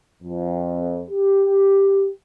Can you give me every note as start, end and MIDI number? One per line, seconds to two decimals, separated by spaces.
0.22 1.02 41
1.11 2.10 67